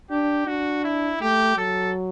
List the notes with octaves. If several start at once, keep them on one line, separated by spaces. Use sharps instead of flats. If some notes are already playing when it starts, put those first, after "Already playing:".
D4 G4
D4 F#4
E4
A3 G4
F#3 A4